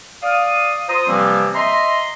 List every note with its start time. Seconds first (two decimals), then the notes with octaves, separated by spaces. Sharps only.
0.23 D5 F5 D#6
0.89 F4 C5 A#5 C6 D#6
1.08 C3 E3 F3 G3 A#3 C4
1.55 D#5 E5 A#5 C6